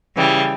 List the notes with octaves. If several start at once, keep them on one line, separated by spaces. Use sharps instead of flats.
C#3 E3 G3